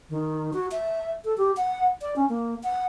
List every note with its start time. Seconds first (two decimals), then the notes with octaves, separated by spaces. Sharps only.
0.10 D#3
0.53 F#4
0.71 E5
1.25 A4
1.38 G4
1.57 F#5
2.02 D5
2.16 C#4
2.29 A#3
2.63 F#5